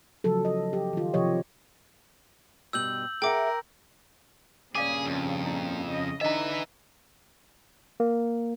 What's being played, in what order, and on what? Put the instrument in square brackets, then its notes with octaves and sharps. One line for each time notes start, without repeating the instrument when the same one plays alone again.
[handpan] C#3 F3 F#3 A4
D#5
G4
D#3 F4
C3 F3 G4 C#5 D#5
[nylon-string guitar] G2 B2 G4 [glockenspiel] E6 G6 F#7
[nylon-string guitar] G#4 E5 F#5 [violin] A#4 [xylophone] G5 D6
[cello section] G2 A#2 C#3 [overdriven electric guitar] G#4 [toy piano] D5 F5 D6
[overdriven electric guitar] F2
[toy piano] E4
[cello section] C#3 D#5
[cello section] D3 E3 D#4 [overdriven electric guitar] B4 E5 [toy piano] D#5 A#5
[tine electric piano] A#3